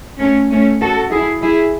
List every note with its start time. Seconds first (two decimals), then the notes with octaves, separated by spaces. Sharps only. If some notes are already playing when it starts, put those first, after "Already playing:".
0.20 A3 C#4
0.51 A3 C#4
0.82 F#4 A4
1.12 E4 G#4
1.42 E4 G#4